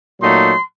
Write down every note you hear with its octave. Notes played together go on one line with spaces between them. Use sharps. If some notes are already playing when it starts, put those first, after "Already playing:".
A#2 F#3 A3 D#4 C6